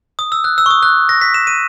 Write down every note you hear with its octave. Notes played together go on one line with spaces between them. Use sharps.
D#6
E6
F#6
E6
C#6
D#6
F#6
A#6
B6
E7
D#7